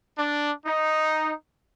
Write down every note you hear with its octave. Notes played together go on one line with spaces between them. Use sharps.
D4
D#4